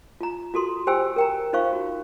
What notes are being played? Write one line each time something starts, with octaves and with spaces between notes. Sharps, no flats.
F4 A#5
F4 F#4 A4 C6
G4 C5 G5 G#5 E6
A#4 G5 A#5
D#4 F4 C5 F5 C#6
F#4